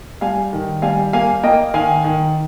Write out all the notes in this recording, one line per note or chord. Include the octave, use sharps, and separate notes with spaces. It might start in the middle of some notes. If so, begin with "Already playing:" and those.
G3 F5 G#5
D#3
G3 F5 G#5
A#3 F5 G#5
A#3 D#5 G5
D#3 F5 G#5
D#3